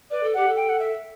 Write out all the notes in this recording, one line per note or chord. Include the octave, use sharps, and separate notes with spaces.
B4 D5
A4
G4 F#5
A4
G5
F#5
E5